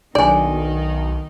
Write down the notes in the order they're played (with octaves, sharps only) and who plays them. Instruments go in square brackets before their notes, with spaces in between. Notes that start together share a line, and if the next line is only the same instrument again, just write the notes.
[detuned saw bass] B1 [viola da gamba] D#3 D#4 [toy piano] D4 G#5 [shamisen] D5